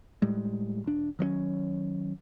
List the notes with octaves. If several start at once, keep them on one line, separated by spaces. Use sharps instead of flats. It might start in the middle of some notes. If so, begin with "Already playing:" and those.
A2 G3 G#3
E1 D4
D#3 F#3 A3 C#4